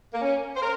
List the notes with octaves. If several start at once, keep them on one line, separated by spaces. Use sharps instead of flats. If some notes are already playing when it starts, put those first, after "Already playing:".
A#3
C#4
C5
A#4